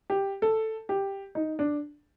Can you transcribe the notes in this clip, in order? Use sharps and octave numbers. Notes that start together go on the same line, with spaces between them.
G4
A4
G4
D#4
D4